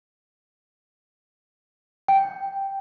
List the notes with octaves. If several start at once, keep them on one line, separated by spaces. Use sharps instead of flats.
G5